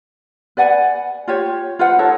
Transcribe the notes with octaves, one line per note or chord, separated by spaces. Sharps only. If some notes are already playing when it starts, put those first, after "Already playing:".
B4 D5 F#5 G#5
F4 G4 C#5
F4 B4 C5 F#5
D#4 A4 C#5 A5